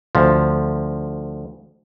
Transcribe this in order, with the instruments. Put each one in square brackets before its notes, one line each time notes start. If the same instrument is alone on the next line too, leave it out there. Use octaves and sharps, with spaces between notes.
[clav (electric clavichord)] D2 F3